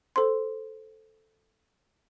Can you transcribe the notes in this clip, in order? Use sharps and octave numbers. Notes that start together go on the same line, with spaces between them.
A4 C5 C6